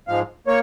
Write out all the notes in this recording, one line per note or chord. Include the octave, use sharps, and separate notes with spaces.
G#2 F3 G#3 F5
A#3 C#5